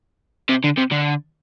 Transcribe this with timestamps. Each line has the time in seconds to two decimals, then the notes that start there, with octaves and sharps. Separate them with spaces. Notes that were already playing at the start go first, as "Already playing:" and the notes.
0.49 C3
0.64 D3
0.77 C3
0.91 D3